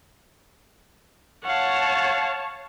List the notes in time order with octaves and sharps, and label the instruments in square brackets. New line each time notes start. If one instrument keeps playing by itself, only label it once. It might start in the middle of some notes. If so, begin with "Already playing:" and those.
[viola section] C#5 A5 [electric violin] F5 F#5